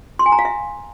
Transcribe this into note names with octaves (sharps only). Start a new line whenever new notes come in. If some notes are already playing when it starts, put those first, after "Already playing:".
C6
G#5
A#5
F5
E5